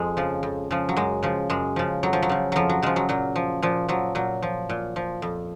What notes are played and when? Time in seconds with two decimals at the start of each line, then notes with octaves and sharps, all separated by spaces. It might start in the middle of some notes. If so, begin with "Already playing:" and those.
Already playing: F2 G#3
0.17 C#3 F3
0.43 F2
0.71 C#3 F3
0.89 F#3
0.96 F#2 G#3
1.23 C#3 F3
1.50 F#2 G#3
1.76 C#3 F3
2.03 F2 F#3
2.13 F3
2.22 F#3
2.29 C#3 F3
2.52 F2 F3 F#3
2.69 F#3
2.82 C#3 F3 G#3
2.96 F#3
3.09 A#2 F#3
3.36 F3
3.62 A#2 F3
3.88 F3 F#3
4.15 A#2 F#3
4.42 F3
4.69 A#2
4.96 F3
5.22 F2